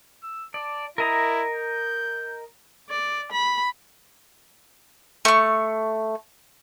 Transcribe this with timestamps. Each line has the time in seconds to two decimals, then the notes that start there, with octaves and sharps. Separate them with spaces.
0.23 E6
0.54 D5 A5
0.98 E4 A#4 D#5 A#5
1.54 G6
2.90 D5
3.32 B5
5.25 A3 C#6